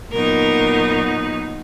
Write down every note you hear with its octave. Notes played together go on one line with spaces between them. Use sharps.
A#2 F#3 B3 D#4 A#4